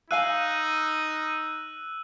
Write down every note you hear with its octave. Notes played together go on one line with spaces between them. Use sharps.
D#4 G#4 F5 G#5 E6 F#6 D#7